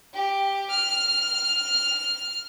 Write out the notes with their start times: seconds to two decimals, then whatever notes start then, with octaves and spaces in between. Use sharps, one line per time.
0.13 G4
0.70 F6